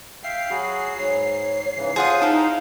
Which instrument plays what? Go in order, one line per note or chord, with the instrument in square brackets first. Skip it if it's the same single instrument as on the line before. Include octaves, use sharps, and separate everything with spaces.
[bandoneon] E5 F5 G5 [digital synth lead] C7
[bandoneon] F#3 F#4 G#4 [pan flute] B5
[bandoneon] G#2 [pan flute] C#5
[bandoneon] G#2 C#3 E3
[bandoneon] F4 C5 [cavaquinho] G#4 F#5 D#6
[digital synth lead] D#4 [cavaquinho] E4 A4 [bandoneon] F5